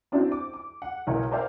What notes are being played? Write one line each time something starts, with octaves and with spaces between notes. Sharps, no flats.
C4 D4 E4 F#4 C5
D6
D6
F#5
B1 E4 A#4 C#5
A#4 C5 D5 E5 F5 G5